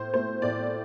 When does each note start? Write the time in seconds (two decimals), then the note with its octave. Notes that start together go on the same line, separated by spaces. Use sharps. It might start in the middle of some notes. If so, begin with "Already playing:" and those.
Already playing: A2 C5
0.14 A3 C5
0.42 A2 D5